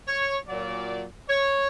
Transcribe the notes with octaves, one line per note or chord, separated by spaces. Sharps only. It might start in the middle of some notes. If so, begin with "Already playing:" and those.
C#5
A#2 F#3 D5
C#5